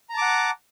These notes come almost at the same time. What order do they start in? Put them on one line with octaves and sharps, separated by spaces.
A#5 A5 D6 F#5